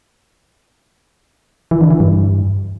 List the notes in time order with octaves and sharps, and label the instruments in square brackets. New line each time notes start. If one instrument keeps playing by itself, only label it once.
[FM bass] E3
D3
E3
G2